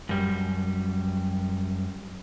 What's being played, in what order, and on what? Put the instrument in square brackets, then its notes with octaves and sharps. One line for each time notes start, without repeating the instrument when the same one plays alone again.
[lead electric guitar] F#2 G3